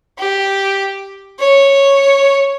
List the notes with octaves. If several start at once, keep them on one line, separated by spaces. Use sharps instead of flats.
G4
C#5